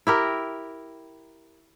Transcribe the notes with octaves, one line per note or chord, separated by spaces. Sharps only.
E4 G4 A#4